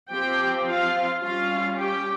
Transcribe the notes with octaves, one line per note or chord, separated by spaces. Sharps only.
F3 C4 G4 G5
F4 F5
G3 C#4 F4 F5
G4 G5